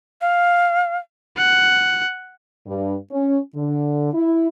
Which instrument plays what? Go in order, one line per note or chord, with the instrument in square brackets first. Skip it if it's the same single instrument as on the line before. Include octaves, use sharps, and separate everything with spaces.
[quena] F5
[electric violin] F#5
[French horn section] G2
C#4
D3
E4